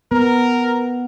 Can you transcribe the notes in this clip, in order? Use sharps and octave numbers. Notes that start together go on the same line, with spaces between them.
B3 A#4